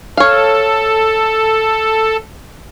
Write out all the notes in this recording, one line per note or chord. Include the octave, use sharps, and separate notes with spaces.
A4 C#5 F5